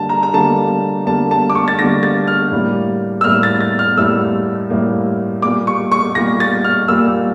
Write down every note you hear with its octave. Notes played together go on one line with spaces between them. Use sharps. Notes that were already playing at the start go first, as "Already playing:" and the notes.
Already playing: D3 G3 A#3 A5
A#5
A#5
D3 G3 A#3 A5
D3 G3 A#3 A5
A5
D6
C#6
A6
D3 G3 A#3 A#6
A6
F6
A2 G3 A#3
E6
A2 G3 A#3 F6
A6
A6
F6
A2 G3 A#3 E6
A2 G3 A#3
A#2 G3 A#3 D6
C#6
C#6
A#2 G3 A#3 A#6
A6
F6
A#2 G3 A#3 E6